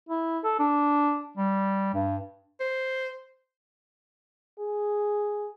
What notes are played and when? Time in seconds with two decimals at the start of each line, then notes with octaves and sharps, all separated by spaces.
0.09 E4
0.44 A4
0.59 D4
1.37 G3
1.94 G2
2.60 C5
4.59 G#4